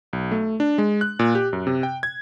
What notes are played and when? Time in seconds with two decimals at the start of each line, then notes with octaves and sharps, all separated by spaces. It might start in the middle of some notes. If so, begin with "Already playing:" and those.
0.13 B1
0.31 A3
0.60 D4
0.78 G#3
1.01 F#6
1.19 A#2
1.35 G4
1.53 F#2
1.67 C3
1.83 G5
2.03 G#6